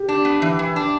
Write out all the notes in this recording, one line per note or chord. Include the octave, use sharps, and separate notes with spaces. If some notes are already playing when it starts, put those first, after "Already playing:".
Already playing: G4
D4
B3
E3
E3
D4